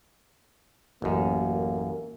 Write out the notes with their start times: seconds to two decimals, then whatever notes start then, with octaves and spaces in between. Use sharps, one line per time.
1.02 A1 F#2 A#3